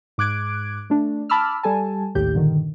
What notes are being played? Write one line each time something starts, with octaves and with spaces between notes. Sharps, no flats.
G#2 D6 F#6 G#6 D7
A3 D4
A5 B5 D6 E6 F6
G3 A4 G#5 A5
A#1 D#2 A2 D#3 G4 G6
G2 A#2 D3 D#3